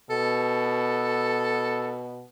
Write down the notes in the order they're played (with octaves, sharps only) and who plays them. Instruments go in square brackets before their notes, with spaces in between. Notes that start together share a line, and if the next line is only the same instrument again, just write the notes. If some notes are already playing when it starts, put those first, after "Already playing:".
[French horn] B2 [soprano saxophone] A4